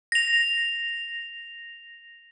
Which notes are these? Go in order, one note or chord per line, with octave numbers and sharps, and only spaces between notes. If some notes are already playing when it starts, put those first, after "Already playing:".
A#6 F7